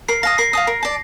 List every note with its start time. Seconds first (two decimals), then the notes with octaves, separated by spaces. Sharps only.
0.08 A#4 C7
0.23 F5 A5 D#6 A#6
0.38 A#4 C7
0.53 F5 A5 D#6
0.67 A#4
0.83 D5 A5